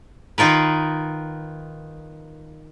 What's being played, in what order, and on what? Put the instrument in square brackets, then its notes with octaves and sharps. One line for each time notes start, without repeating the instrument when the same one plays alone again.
[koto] D#3 D#4 F4 A#4 B4